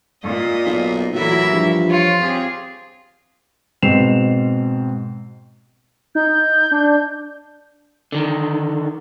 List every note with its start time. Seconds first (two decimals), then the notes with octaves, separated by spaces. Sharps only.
0.25 A#2 D#5
0.66 B1
1.15 A#2 E3 F#3 A3 E4 A#4 E5
1.52 G2 F3
1.91 F4 C#5
2.20 C4 G4 G#4
3.82 G#2 B2 C4 C7 E7 F7
6.15 D#4 G6
6.71 D4
8.12 D3 D#3